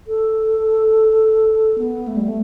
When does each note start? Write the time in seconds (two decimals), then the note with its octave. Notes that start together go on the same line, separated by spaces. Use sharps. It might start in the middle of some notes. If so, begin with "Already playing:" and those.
0.07 A4
1.78 B3
2.08 A3
2.17 G3
2.24 A3